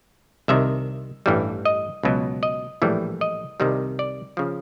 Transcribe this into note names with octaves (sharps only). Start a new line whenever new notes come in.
C2 C3 D#3 E5
A1 G2 E3 G3
D#5
C#2 B2 F#3
D#5
A#1 A2 E3 G3
D#5
C2 C3 D#3 G3
D5
C#3 F3